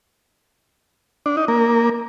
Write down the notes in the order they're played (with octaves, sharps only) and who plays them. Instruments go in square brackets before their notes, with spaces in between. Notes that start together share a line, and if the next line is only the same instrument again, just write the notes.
[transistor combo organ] D4
D#4
A#3